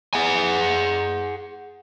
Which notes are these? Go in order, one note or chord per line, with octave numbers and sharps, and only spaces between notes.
G#4 F#5 G#5